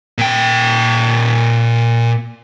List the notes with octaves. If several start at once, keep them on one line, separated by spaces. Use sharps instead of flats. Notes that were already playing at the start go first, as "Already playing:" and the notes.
A#2 G5